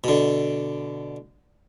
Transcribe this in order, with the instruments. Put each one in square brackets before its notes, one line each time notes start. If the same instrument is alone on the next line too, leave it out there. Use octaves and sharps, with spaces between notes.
[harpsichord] B2 D3